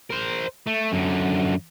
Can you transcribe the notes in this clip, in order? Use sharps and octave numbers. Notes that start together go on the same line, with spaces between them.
A#4 C5
A3
F#2 D3